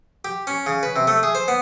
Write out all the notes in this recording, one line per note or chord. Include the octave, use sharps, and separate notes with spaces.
G4
C#4
C#3
B4
C3
A3
G#4
C5
B3